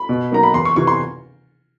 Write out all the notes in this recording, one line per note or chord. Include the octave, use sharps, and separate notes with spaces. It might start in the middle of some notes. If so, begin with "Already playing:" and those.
Already playing: B5
B2
F#3 A#3 D#4 A#5
B5
E2 C6
C#6
C3 E3 C#6
C6